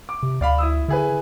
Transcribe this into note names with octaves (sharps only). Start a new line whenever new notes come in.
D6
C3
D2 D5 F5 B5
E4 D#6 E6
D3 E4 G#4 B4